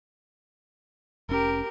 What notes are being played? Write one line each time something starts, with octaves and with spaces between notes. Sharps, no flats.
F1 C#4 G4 A#4